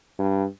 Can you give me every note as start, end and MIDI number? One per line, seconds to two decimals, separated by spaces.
0.19 0.45 43